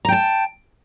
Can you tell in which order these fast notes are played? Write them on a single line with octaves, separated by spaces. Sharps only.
A#5 G5 A5